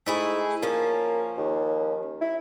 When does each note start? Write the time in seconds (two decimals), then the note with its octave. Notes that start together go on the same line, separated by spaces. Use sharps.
0.06 G#2 A3 E4 G#4
0.62 F3 A#3 C#4
1.37 D#2
2.21 E4